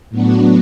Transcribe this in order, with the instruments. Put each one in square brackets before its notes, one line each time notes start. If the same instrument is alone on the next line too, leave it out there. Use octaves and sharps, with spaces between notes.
[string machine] A2 F#3 B3 D4 F#4